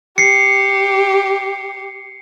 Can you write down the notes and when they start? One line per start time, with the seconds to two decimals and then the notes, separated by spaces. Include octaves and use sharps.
0.18 G4 C7 C#7